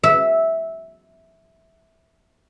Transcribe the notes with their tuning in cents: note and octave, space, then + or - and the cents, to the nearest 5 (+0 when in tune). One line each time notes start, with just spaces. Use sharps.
E5 -10